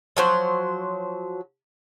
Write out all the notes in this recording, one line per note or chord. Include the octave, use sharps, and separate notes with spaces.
F3 F#3 C5